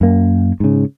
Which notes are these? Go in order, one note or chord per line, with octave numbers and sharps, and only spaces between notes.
F#2 A#3
G#2 C#3